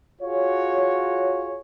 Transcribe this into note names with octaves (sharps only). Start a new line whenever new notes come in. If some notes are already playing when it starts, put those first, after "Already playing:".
F4 F#4 G#4 C#5